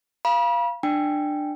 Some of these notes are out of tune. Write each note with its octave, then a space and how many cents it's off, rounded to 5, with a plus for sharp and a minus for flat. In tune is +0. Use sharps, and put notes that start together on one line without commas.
F5 -15 B5 -40
D4 +20 G5 +0